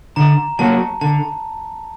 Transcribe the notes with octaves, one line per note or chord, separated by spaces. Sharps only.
D3 A#5
F#3 A#3 F#4 A5
D3 A5